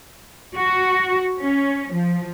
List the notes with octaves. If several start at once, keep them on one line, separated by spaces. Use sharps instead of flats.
F#4
C#4
F3